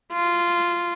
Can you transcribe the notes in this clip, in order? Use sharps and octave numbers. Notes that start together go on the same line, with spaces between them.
F4